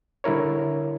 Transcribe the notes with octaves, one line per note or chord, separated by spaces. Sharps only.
D3 G3 E4 A#4 C#5